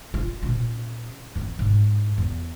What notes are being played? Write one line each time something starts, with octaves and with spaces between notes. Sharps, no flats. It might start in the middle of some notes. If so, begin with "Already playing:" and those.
F4
A#2 C#4
E3 C4
G#2
E2